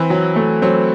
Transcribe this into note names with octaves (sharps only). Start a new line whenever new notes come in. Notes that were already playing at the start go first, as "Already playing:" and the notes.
Already playing: E3 C4
F#3
A3
F#3 C4